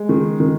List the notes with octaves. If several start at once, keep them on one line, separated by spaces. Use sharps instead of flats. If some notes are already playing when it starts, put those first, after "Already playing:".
Already playing: G#3
D#3
D#3